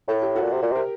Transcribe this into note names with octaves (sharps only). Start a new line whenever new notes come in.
A2 A4
G4
F#4 A4
A#2
C3
A#2
C3 G4 A#4